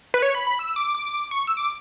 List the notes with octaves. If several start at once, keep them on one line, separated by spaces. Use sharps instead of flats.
B4
C#5
B5
B5
E6
D6
D6
C#6
E6
D6